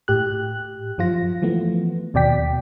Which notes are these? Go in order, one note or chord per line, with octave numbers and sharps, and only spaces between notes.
A2 G4 F#6
F#2 F3 F4 A#6
E3 F3 A3 B3
D#2 B2 D5 G5 B6